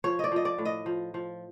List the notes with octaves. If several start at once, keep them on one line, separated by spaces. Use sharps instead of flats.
F3 C#5
D5 D#5
F3 D#5
D5
A2
D#5
F3
F3